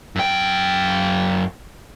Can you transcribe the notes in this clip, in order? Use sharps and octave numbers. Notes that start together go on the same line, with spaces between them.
F#2 G5